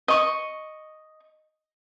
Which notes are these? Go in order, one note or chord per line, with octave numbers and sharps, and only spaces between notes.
D#5 C#6